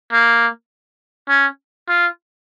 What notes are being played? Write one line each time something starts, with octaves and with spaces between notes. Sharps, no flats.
A#3
C#4
F4